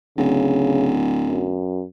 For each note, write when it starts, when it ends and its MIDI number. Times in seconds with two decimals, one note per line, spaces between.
0.18 1.60 26
0.18 0.99 49
1.26 1.84 42